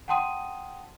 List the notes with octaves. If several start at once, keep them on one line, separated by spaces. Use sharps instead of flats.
F#5 G5 A5 C6 D#6 D#7